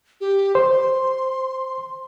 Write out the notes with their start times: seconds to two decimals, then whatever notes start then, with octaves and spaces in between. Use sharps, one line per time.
0.21 G4
0.55 C5 C6